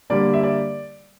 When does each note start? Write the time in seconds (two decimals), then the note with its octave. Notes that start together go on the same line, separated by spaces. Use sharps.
0.10 D3 G3 A#3 D5
0.34 E5
0.43 D5